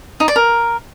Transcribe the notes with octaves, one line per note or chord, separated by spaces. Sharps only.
D#4
D5
A#4